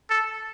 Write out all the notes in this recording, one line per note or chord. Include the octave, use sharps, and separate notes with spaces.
A4